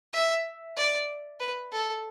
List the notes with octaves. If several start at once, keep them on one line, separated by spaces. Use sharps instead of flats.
E5
D5
B4
A4